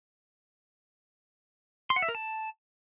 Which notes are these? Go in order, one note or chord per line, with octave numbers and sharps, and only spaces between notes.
C6
F#5
E5
A#4
A5